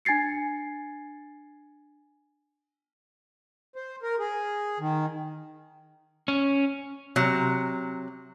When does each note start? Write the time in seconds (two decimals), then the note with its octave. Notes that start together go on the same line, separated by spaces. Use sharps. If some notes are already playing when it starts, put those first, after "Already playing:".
0.05 D4 G#5 G#6 A6 C7 C#7
3.76 C5
4.03 A#4
4.19 G#4
4.80 D#3
6.28 C#4
7.16 C3 F#3